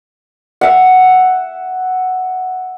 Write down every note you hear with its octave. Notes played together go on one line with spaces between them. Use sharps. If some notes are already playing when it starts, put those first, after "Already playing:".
E5 F#5